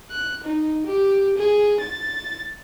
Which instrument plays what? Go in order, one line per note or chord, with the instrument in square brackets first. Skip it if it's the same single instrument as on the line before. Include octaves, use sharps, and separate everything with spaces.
[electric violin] F#6
D#4
G4
G#4
A6